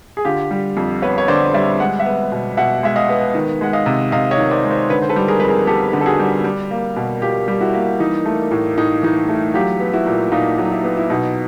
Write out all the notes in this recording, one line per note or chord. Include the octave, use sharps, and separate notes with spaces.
G#4
D3 F4 G4
G3
F2
B3 B4 C#5
C#5
D3 C5 D5
G3 D5 E5
G#3 F#5
E5 F#5
B3
B2
B2 E5 F#5
G#3 E5
D#5 F5
B3
D#3
G#3 F#5
D#5 F5
C3
C3 D#5 F5
C#5 D#5
D#3
C5 D5
G#3
C5 D5
D3 B4 C#5
C5
A4 B4
G3
G#4 A#4
F2 B4
G#4 A#4
B3 G4 A4
D3
A4
F#4 G#4
G3
G3
A#3
B2
B2 F4 G4
G3
E4 F#4
A#3
E3 D#4
A3
A2
A2 D#4
E3 D#4
A3
F#3 F4 G4
B3
E4 F#4
A#2
A#2 D#4 F4
F#3
D#4
E4
B3
E4
B2 D#4